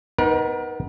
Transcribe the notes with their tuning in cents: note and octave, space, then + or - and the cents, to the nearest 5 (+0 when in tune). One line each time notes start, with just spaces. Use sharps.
B3 +15 D#4 +0 A#4 +35